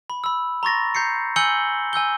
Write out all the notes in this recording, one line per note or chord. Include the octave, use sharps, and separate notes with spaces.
B5
B5 E6
A#5 C6 C#6 A6 A#6
A#5 G6 C7 C#7
G#5 E6 G6 C#7 F#7 G7
G#5 E6 G6 G7